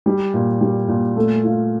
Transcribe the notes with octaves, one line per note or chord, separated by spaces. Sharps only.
G3
A#2
G3
A#2
A3
F4